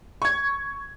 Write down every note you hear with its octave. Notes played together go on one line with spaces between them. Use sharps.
C#6 G#6